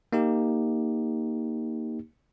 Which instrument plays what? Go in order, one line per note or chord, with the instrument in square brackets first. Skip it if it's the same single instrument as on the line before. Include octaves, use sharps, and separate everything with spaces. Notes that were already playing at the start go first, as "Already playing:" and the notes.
[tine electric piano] A#3 D#4 G4